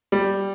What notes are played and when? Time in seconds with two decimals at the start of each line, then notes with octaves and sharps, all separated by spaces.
0.12 G3